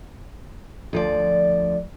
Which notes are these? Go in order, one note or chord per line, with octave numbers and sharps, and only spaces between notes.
D2 F3 D5